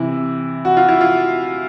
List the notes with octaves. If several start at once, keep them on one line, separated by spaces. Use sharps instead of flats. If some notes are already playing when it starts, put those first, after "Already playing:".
Already playing: C3 E3 E4
F#4
F4
E4
F4